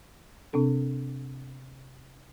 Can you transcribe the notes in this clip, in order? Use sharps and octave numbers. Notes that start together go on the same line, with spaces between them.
C3 C4 D4 A4